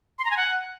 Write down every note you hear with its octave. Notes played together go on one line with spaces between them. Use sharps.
C6
A#5
G#5
F#5